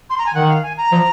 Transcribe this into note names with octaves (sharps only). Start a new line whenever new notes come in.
C6
A#5
G#5
D#3 F#5
F5
G#5
A#5
F3